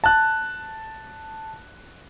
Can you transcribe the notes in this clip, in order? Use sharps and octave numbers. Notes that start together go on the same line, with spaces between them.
A5 F#6